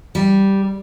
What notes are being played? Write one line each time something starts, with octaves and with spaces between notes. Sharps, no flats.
G3